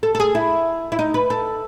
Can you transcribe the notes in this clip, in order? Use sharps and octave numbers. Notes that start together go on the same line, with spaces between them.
A4
A4
G#4
E4
E4
D#4
B4
A4